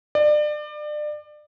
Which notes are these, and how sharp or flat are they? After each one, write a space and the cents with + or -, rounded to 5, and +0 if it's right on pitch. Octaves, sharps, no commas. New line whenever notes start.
D5 +30